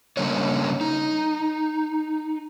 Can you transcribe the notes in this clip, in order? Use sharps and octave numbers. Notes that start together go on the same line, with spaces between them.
C#3 G3 A#3 C#4 D4 C#5
D#4